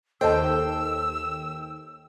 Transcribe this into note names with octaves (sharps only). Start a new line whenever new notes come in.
D#2 A4 C5 D#5 G5 A5 E6